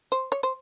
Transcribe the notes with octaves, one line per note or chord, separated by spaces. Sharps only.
C5
C#5
C5